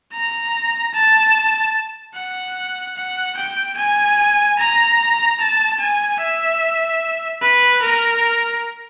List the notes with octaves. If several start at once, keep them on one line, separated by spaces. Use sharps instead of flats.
A#5
A5
F#5
F#5
G5
G#5
A#5
A5
G#5
E5
B4
A#4